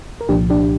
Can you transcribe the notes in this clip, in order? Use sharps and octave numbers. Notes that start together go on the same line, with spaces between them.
A#4
C2 A#2 F3 D4 G4
D4 G4